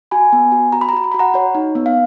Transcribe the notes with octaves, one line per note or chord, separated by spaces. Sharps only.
F#4 G#5 B5
B3
F#4
F#4 A#5
B5
A#5
F#4 B5
A#5
F#4 B5
F#5 A#5
F#4 C#5
D#4
B3
F5